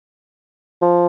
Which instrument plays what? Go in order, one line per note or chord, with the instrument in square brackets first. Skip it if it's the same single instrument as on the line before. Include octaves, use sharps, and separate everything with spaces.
[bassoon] F3